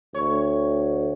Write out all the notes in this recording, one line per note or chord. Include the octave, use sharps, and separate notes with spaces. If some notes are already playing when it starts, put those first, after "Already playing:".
D2 C#5